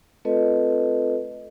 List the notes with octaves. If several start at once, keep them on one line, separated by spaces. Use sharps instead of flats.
A3 C4 F4 A4 B4 D#5